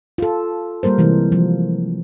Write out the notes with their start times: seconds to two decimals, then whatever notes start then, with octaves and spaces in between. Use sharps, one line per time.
0.18 F4 A4
0.83 G3 A#3 A#4 C5
0.98 C3 E3 G#3 C4
1.32 F3